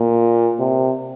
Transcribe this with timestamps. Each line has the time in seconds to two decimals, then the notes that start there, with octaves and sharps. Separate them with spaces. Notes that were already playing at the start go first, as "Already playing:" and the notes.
Already playing: A#2
0.59 C3